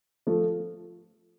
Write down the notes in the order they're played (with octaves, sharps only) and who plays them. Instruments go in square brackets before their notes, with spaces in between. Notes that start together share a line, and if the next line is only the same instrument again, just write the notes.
[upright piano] F3 A3